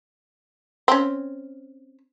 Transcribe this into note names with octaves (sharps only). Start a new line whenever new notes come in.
C4 C#4